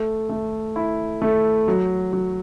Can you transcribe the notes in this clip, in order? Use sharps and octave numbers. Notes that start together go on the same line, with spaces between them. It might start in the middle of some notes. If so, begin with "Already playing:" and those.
Already playing: A3
A3
E4
A3
F#3
F#3